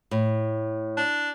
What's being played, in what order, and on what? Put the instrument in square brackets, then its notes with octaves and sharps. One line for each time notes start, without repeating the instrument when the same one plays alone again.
[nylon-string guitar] A2
[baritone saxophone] D4